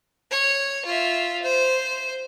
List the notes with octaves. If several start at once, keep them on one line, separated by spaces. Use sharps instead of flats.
C#5
F4 E5
C5